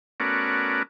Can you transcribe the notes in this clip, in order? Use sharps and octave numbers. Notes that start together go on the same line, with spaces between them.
A3 B3 C#4 F#4 A#4 D5